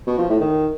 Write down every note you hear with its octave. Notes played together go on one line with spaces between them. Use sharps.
B2
F3
A2
D#3